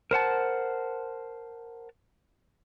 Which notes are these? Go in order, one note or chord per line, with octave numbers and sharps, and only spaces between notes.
A#4 C5 F#5 A5